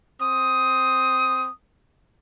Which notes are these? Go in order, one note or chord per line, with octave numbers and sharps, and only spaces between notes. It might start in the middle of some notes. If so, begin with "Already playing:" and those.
C4 D#6